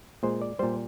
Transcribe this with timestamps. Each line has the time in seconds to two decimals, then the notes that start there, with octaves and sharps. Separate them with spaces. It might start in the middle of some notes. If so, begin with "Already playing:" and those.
0.23 A#2 G#3 C5
0.42 D5
0.59 A#2 G3 C5